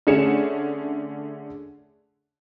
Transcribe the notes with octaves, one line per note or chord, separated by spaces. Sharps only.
D3 A3 C#4 G#4 C#7 E7